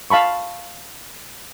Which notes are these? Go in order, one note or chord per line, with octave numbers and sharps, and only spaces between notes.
F5 A5 B5 C#6